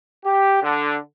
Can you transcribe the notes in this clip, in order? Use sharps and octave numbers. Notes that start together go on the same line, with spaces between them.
G4
D3